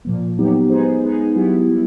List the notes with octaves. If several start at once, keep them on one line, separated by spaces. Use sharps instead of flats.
A#2 F3 A#3
F#3 B3 D#4 G4
G#3 B3 D#4 G#4 C5
G#3 B3 D#4 G#4
F#3 B3 E4 G4
G3 B3 E4